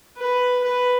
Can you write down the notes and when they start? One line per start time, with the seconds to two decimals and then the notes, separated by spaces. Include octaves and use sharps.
0.18 B4
0.63 B4